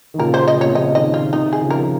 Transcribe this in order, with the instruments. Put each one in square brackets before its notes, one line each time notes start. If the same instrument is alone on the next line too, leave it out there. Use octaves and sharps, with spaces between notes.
[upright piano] D#3
[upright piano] A#2 C#3 [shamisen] A#4
[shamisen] C5
D#5
[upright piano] A#2
[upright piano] C3 [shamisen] C#5
[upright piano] A#2 C#3 [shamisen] D#5
[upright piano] C3 D#3 [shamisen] D#5
[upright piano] C3 D#3 [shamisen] F4
[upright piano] C3 D#3 [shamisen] D#4
[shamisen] G#4
[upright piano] C#3 F3
[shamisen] A#4
[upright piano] F3